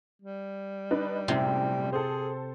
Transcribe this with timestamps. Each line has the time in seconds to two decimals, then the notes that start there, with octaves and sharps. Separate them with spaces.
0.22 G3
0.91 D4 D#4 B4
1.28 A#1 F#2 A2 C3
1.92 G#4 A4 C5